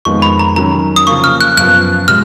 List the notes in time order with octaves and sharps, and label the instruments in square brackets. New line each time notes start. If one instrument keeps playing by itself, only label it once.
[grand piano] F2 D#3 G#3 B3 D#4 [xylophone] C#6
[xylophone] B5
A#5
[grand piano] D#3 F#3 C#4 [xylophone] A#5
[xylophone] D#6
[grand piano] C#3 F3 A#3 C#4 [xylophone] C#6
[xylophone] F6
F#6
[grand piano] F#2 F3 B3 [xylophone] F#6
[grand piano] B2 G#3 [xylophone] F6